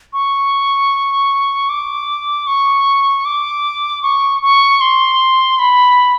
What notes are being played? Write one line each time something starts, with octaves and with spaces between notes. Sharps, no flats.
C#6
D6
C#6
D6
C#6
C#6
C6
B5